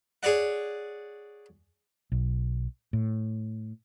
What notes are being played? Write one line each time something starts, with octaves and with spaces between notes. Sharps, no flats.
G#4 C#5 D5 F#5
B1
A2